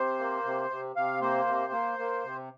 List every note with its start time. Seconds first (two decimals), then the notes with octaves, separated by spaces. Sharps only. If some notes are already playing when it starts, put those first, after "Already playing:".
Already playing: C3 C5
0.20 A#3
0.45 C3
0.70 C3
0.96 C3 F5
1.21 A#3 C5
1.48 C3
1.72 A#3
1.99 A#3
2.24 C3